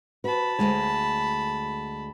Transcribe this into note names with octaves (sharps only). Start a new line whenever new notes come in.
F#4 B4 A5 B5
D2 G#3 C#5